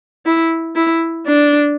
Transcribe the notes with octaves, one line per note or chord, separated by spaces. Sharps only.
E4
E4
D4